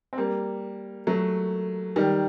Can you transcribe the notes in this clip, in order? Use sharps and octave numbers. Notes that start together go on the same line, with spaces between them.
C4
G3 A#3
F#3 A3
D#3 G3